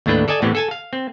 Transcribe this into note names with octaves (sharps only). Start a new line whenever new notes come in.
D#2 A2 A3 D4 B4 G5
A4 D5 D#5 G#5 A5
A2 E3 B3 C4 G4
A4 G#5 A5
F5
C4